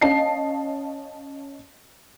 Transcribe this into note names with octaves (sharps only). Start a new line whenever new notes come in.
C#4 D#5 F5 A5 C7